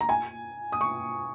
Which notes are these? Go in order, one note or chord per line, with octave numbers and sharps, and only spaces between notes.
A#5
G#5
D#6
C#6